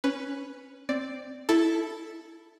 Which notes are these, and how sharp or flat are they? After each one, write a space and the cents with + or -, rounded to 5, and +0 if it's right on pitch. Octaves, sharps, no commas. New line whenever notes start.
C#4 +0 B4 +0
C4 +0 D5 +0
E4 +0 A4 +0